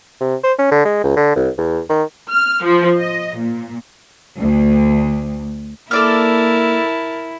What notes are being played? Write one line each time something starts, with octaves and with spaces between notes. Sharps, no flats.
C3
C5
C#4
D3
G#3
C#2
D3
C2
E2
D#3
F6
F3
D#5
A#2
D2
A#3 E4 A4 A#4 D5 A5 F6